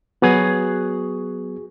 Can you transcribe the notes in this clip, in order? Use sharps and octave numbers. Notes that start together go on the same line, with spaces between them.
F#3 B3 F#4 G#4 G#5